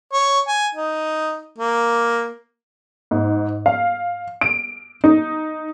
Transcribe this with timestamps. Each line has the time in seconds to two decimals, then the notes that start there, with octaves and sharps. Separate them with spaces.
0.13 C#5
0.48 G#5
0.75 D#4
1.58 A#3
3.11 G#2
3.66 F5
4.41 D7
5.04 D#4